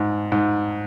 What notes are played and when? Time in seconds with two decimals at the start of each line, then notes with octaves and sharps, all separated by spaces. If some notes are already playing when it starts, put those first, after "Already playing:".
Already playing: G#2
0.32 G#2